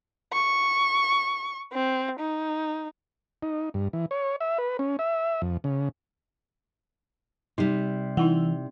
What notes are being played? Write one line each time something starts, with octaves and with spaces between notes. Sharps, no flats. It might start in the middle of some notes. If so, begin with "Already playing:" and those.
C#6
C4
D#4
D#4
G2
E3
C#5
E5
B4
C#4
E5
F2
C#3
C3 G3 D#4
E3 D#4 E4 F#5